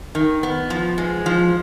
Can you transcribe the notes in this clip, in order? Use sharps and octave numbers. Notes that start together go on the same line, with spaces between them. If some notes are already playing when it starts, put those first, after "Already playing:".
D#3
B3
F3
G#3
F3